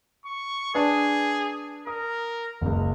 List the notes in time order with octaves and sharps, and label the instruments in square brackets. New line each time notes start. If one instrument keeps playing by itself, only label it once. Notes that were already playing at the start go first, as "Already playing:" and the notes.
[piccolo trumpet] C#6
[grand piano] D4 B4 A5 [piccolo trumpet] G#4
[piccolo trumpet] A#4 [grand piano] D#6
[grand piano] F#1 C#2